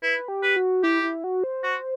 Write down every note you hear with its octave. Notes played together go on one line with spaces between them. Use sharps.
E4 B4
G4
B4
F#4
E4 G4
E4
F#4
C5
F#4